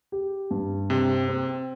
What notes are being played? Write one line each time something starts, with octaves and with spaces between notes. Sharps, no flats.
G4
G2
C3 C4
C4